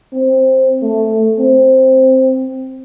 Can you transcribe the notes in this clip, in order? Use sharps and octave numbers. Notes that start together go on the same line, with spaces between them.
C4
A3
C4